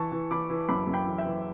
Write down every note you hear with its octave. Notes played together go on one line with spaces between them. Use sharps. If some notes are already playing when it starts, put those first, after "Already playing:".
Already playing: E3 A5 C#6
E3
E3 B5 D6
E3
F#2 B5 D6
F#2
G5 B5
E3
E5 G5
E3